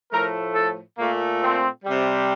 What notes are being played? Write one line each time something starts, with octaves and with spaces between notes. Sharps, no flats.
A2 F3 A3 A#4
A4
A#2 A3 A#3
C4
C3 G3